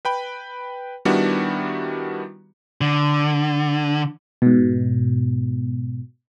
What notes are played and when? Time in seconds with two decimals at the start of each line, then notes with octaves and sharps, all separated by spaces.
0.05 B4 G5 B5
1.05 D#3 G3 B3 D4 E4 F#4
2.81 D3
4.42 G#2 B2